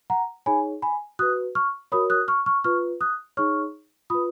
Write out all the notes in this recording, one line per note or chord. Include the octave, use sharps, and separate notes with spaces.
F#5 A#5
D#4 G#4 C#5 G#5 B5
G#5 B5
F#4 B4 D#6 F#6
C#6 F6
F#4 A#4 C#5 B5 D#6
D#6 F#6
C#6 F6
C#6 F6
F4 B4 C#6 F6
D#6 F#6
D#4 G#4 C#5 C#6 F6
F4 B4 B5 D#6